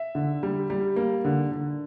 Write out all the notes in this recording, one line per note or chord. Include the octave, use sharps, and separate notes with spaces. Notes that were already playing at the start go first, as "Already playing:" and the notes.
Already playing: E5
D3
G3
G3
A#3
D3
D3